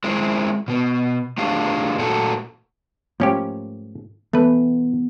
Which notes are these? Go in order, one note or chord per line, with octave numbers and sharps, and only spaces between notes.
G#3 C4 E4
B2 B3
A3 D4 F4 G4 G#4
A#2 A3 F#4 A4
G#2 F3 A3 A#3 C#4 G4
E3 A3 B3 B4